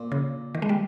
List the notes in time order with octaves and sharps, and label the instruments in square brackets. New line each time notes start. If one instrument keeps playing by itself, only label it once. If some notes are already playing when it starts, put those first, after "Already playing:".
Already playing: [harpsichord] A#2
[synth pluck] C#3
D#3
G#3
G3